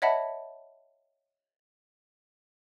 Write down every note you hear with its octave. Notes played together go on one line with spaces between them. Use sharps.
C#5 D#5 E5 F#5 A5 B5